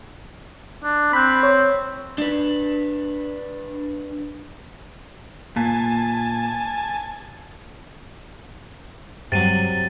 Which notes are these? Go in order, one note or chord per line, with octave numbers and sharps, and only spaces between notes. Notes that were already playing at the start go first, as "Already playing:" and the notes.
D4
C4 B5 F#6
C#5
D4 B4
A#2 G#5 A5
G2 C3 F#3 G3 A6 D#7